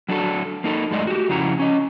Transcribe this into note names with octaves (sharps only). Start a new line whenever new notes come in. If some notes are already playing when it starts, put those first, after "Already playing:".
F#3 D4 F#4 A4
A#3 D#4 A4
F#2 A2 G#3 A3 D5 D#5
F#4 G4
F2 C#3 E4 F#5 A#5
C#4 D#5